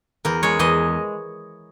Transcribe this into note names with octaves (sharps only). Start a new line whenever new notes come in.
E2 A#4
G#3 C#5
E2 D#5